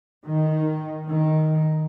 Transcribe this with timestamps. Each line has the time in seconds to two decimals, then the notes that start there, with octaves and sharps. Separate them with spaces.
0.25 D#3
1.09 D#3